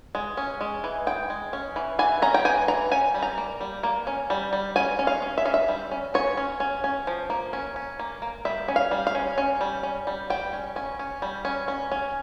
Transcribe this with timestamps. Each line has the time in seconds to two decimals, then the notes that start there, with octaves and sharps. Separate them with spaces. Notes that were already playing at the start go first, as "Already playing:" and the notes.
0.15 G#3
0.37 C#4
0.61 G#3
0.84 E3
1.07 G#3 G5
1.30 G#3
1.53 C#4
1.76 E3
1.99 E3 G#5
2.22 C#4 A#5
2.34 G5
2.45 E3 G#5
2.68 E3 A#5
2.91 C#4 G#5
3.14 G3
3.22 A#5
3.38 A#3
3.61 G3
3.83 A#3
4.07 C#4
4.30 G3
4.53 G3
4.76 C#4 G#5
4.99 C#4
5.07 F5
5.22 C#4
5.38 E5
5.45 C#4 F5
5.54 E5
5.68 G3
5.91 C#4
6.14 C#4 C#5
6.37 C#4
6.60 C#4
6.84 C#4
7.07 F3
7.30 A#3
7.53 C#4
7.76 C#4
7.99 A#3
8.22 A#3
8.45 G3 E5
8.68 C#4
8.76 F5
8.91 G3
9.07 F5
9.15 C#4
9.38 C#4
9.61 G3
9.83 C#4
10.07 G3
10.30 G3 G5
10.53 C#4
10.76 C#4
10.99 C#4
11.22 G3
11.45 C#4
11.68 C#4
11.91 C#4